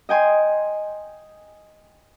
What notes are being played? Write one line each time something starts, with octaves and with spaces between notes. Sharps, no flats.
D#5 G5 G#5 C6